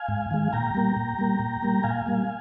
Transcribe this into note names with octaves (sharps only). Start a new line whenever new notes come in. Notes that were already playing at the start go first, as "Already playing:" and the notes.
Already playing: F5 G#5
G#2
D#3 G#3
A#2 G5 A#5
G3 A#3
A#2
G3 A#3
A#2
G3 A#3
A#2 F5 G#5
G3 A#3